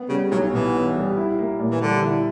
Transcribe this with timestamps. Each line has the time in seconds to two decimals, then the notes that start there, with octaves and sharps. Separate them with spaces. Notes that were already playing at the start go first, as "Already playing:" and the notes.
Already playing: B3
0.09 C#3 G3
0.31 B1 F#3
0.52 B2 E3
0.74 B3
0.95 G3
1.16 E4
1.39 A#3
1.59 A#2
1.71 E3
1.81 D3 G3
2.02 E4